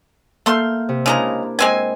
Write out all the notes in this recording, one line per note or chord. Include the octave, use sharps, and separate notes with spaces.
A3 A#3 C6 F6 G6
C3
C#3 G#3 D4 E4 A#4 A#5
G#3 C4 G#5